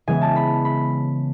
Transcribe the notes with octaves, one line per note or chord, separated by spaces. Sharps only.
C#3 E3 G#3 B3 G#5
A5
B5
B5